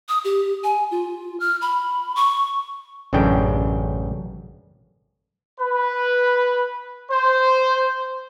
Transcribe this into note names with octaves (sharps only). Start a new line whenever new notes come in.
D#6
G4
G#5
F4
F6
B5
C#6
A1 F#2 C#3 D4 G5
B4
C5